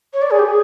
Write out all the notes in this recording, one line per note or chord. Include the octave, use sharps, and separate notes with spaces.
C#5
D5
G#4
G4
G#4